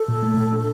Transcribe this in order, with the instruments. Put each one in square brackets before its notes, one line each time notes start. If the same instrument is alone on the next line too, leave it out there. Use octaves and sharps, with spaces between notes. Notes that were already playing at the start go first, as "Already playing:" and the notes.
Already playing: [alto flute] A4
[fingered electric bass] A#2
A3
A#2
D4